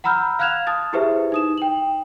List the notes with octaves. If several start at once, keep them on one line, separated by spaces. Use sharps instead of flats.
F#5 A#5 B5 E6 F6 G6
F5 F6 F#6 G#6 E7 F7
A5 D#6 A6
E4 G4 G#4 B4 C5 E5
D#4 D#6 E7
G5 F#7